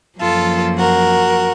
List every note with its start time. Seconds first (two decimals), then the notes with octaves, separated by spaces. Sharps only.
0.20 F#2 F3 A#3 F4 A4
0.78 F#4 A#4